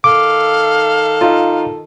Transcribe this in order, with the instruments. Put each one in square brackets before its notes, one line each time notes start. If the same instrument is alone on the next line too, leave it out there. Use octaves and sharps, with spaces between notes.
[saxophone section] D#3 A4 [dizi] F5 [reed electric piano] D6
[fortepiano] D#4 F4